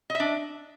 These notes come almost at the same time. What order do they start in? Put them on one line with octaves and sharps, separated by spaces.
D#5 E5 D4